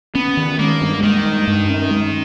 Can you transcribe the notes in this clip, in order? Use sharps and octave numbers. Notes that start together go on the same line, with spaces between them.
B3 C#4
D#3
G#3 A#3
G2
D#3 G#3
G2
G2
C#4
G#3